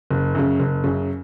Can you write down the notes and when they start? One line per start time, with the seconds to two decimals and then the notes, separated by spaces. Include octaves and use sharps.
0.11 F#1
0.35 F#2 C#3
0.60 F#1
0.84 F#2 C#3